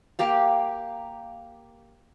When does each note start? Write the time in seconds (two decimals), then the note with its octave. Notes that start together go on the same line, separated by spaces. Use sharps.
0.19 A#3 G4 F5